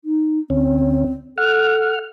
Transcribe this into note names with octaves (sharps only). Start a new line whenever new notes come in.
D#4
D2 C4 C#4
A4 F#5 F6